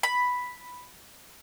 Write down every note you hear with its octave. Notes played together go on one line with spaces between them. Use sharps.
B5